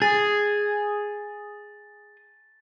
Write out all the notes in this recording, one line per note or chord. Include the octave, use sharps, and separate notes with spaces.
G#4 A6